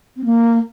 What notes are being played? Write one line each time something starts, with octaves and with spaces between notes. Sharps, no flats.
C4
A#3